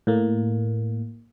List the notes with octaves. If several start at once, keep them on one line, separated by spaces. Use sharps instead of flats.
A2 A#3